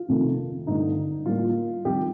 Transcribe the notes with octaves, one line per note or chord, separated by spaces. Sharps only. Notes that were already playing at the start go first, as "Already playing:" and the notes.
Already playing: F4
F2 C3 D#3 A3
G2 D3 A3 D#4
A2 G3 A#3 F4
F2 D#3 G3 G4